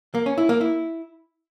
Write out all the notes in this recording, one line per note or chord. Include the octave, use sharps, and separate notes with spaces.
A#3
C#4
E4
A#3
E4